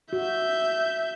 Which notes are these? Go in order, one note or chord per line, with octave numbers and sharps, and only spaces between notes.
F#4 E5 G6